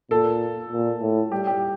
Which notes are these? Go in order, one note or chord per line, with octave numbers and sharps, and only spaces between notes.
A#2 A4
A#2
A2
G3 G4
G4